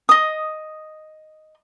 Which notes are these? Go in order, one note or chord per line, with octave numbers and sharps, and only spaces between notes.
D#5 D#6